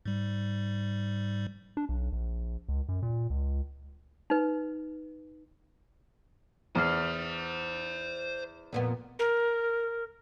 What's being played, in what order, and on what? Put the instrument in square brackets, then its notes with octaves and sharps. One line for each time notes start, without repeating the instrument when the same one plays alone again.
[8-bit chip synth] G#2 G3
[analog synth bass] D4
B1
A#1
C#2
F#2
A#2
C#2
[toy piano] D#4 B4
[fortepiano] E2 [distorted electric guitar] C5 F#5 [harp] D#6 F6 C7
[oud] F2 A#2 B3
[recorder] A#4